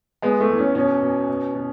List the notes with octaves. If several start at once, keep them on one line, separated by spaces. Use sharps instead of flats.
G#3 B3
A3
E2
C#4
B2 C#4
B2
B2
B2